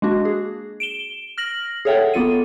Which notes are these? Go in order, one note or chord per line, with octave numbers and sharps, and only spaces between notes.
G#3 A#3 D4 F#4
G#4
D7 E7 G7
F6 A#6 F#7
G#4 A4 C#5 E5 F#5 G5
A#3 B3 F4 A4 D#7